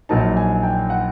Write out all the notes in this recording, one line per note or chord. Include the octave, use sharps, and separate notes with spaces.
A#1 A#2 F#3 A#3 D#4 A5
G#5
G5
F#5